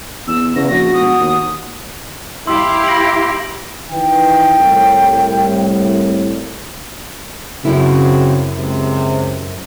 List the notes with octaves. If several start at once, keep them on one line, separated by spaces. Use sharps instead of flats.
E2 E6
E2 C#3 A#6
A#1 F#4
E1 D#6
D#2
E4 G4 F5 C6 E6
A#6 D7 F#7
D#3 E3 G5
C2 A2
F#2 C#3 F#3 C4 E4
C#2 C3